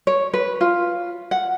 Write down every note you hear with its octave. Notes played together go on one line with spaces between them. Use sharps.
C#5
B4
F4
F#5